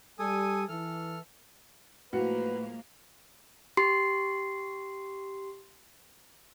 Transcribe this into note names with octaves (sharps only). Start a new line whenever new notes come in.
G3 A4 G#5 D#6
E3 A4 F6
A2 F3 G#3 A#3 F#4 B4 C#7
G4 C6 C7